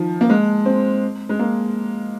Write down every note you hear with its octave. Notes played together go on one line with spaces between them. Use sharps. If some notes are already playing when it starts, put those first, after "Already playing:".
Already playing: D#3 F3
A#3
G#3
C4
G#3
A#3